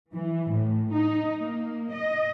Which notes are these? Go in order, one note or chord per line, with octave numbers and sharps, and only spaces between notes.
E3
A2
D#4
A#3
D#5